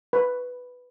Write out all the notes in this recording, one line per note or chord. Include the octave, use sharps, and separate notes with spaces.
B4